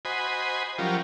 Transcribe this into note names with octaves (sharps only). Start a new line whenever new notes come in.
F#4 C5 D#5 G#5 B5
F3 F#3 C#4 F4 G4 A#4